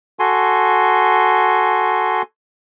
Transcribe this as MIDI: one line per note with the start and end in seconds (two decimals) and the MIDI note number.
0.19 2.22 66
0.19 2.22 69
0.19 2.22 80
0.19 2.22 84